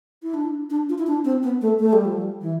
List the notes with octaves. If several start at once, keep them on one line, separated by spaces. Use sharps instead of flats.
E4
D4
D4
F4
E4
D4
C4
B3
A3
A3
G3
F3
G3
E3